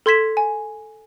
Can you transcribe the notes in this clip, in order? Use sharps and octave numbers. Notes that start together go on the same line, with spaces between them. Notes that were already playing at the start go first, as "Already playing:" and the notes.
A4 C6 G#6 B6 E7
G#5